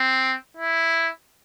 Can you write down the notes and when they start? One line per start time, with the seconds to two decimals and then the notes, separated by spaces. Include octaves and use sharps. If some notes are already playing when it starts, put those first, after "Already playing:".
Already playing: C4
0.57 E4